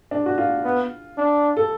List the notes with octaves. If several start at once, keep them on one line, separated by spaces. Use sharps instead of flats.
D4
F#4
F4
B3
D4
A4